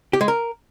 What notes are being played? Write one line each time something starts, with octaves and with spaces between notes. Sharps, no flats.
G4
G#3
A#4